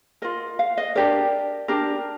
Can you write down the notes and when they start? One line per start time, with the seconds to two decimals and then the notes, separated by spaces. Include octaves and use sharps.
0.22 F4 A#4 D#5
0.59 F5
0.77 D#5
0.95 D4 G4 A#4 D5
1.68 D4 G4 A#4